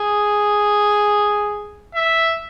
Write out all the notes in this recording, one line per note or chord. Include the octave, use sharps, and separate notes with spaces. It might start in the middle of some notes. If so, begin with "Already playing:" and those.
Already playing: G#4
E5